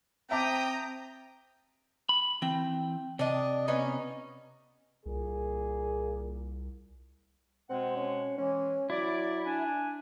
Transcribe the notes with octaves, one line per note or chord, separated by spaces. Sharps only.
C4 E5 G5 A5 A#5 D6 D#6
B5
E3 C4 G5
C3 D4 D#5
B3 C#4 D#4
C2 A#2 A#3 G#4
B2 G#3 C4 F#5
C#4
E3 G#3 C#4
F#3 E4 D5
D4 G#5